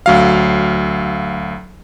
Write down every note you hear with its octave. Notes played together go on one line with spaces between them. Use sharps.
D2 F#3 F5